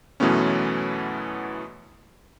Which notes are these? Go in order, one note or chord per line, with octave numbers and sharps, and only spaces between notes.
F#2 B2 E3 A3 B3 C#4